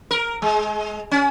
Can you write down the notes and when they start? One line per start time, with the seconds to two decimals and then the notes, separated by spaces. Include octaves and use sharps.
0.11 A#4
0.42 G#3
1.11 C#4